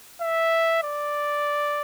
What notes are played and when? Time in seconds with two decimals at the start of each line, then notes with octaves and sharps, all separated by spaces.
0.21 E5
0.83 D5